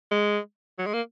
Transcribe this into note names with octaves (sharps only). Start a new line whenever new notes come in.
G#3
F#3
G#3
A#3